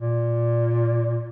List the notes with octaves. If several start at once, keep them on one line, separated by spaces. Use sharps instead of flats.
A#2